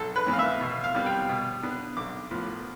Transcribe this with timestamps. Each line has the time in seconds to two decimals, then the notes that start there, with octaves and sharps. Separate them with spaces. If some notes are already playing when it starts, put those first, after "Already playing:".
Already playing: B1 A4
0.16 B4
0.26 A2 E3 B3
0.33 F5
0.39 E5
0.61 B2
0.84 F5
0.95 G3 B3
1.06 G5
1.29 B2
1.63 B3 D4
1.97 B1 D6
2.31 A2 F3 B3